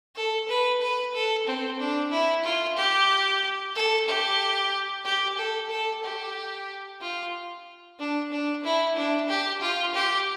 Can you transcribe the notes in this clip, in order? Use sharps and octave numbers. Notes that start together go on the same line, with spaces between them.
A4
B4
B4
A4
C4
D4
E4
F4
G4
A4
G4
G4
A4
A4
G4
F4
D4
D4
E4
D4
G4
F4
G4